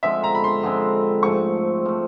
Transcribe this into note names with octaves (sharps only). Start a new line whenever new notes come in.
D3 F3 G#3 C4 E5
A#5
B5
C6
D3 F3 G#3 C4
G#2 F3 A3 C#6
F3 A3